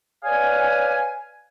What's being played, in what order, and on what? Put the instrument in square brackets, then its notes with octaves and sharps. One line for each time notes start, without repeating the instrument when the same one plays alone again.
[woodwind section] B4 C#5 D5 F5 G#5